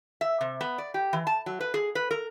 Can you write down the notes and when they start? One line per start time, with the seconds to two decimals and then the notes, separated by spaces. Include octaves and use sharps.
0.21 E5
0.41 C3
0.61 B3
0.78 D5
0.94 G4
1.13 E3
1.27 A5
1.46 F#3
1.60 B4
1.74 G#4
1.95 B4
2.11 A#4